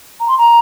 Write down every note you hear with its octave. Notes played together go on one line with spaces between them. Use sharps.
A#5
C6
A#5